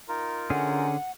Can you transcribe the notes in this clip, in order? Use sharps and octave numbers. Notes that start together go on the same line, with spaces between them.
D#4 F4 A#4
D3 C#4 G#4 F#5